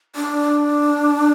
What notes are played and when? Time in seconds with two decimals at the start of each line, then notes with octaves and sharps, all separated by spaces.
0.16 D4